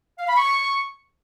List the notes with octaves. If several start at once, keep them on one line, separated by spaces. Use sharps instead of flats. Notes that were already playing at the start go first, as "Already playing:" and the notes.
F5
B5
C#6